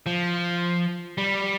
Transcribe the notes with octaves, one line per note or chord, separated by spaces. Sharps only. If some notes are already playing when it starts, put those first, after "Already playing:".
F3
G3